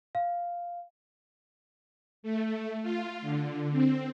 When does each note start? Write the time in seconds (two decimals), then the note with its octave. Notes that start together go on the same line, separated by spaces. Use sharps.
0.15 F5
2.23 A3
2.82 F4
3.22 D3
3.71 C4